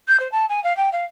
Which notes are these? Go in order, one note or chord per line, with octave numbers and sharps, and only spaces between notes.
G6
C5
A5
G#5
F5
G5
F5